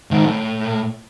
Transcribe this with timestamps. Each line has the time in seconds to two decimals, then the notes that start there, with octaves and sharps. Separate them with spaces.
0.11 G#2 D#3
0.26 A2